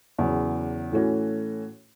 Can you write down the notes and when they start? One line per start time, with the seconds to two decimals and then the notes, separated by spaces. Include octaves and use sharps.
0.18 E2 C#3 F#3
0.92 A2 E3 A3 C#4 F#4